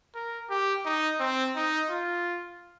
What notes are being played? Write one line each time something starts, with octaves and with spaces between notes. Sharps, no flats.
A#4
G4
D#4
C4
D#4
F4